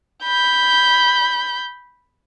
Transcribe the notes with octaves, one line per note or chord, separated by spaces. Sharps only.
B5 G6